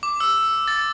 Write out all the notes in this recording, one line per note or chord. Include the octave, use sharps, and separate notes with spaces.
D6
E6
A6